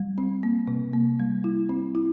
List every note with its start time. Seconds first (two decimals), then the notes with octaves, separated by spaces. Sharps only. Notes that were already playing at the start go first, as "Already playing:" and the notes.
Already playing: G3
0.18 C4
0.43 A#3
0.67 C3
0.93 A#3
1.20 G3
1.44 E4
1.69 C4
1.95 E4